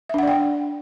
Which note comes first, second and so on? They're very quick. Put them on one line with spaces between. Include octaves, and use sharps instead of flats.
E5 D4 F#5 D5 G5